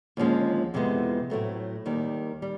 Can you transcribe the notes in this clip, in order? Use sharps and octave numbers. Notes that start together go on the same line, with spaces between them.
D#2 D3 F3 G#3 C#4
F2 C3 E3 G#3 B3
A2 F#3 A3 C4
D#2 D#3 G3
G3